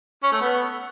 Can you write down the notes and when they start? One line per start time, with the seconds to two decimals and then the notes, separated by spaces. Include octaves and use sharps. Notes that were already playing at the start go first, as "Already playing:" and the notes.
0.23 C#4
0.32 A3
0.41 B3